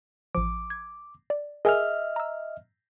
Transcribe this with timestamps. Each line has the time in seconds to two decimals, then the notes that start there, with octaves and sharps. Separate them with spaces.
0.35 A1 F3 D6
0.70 G#6
1.30 D5
1.65 G#4 A#4 D#5 E5 G#5 F6
2.16 A#5 E6